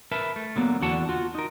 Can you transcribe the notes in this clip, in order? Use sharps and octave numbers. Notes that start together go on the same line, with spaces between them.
A#4 B4 E5 A5
A3
D3 F#3 A#3 B3
E2 D3 F#4 F#5 A5
F4 F#4
D#4 A#4